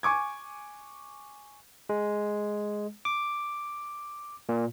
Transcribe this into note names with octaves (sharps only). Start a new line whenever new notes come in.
G#5 C#6 D6 G#6
G#3
D6
A#2